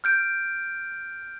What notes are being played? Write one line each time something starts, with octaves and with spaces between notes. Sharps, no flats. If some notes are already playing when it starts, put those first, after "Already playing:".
F6 G6 D7